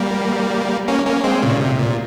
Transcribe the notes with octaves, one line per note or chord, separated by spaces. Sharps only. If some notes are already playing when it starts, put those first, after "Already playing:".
Already playing: G3 A#3
A#3 C#4
A#3 C#4
G#3 C4
A#2 C#3
C3
A#2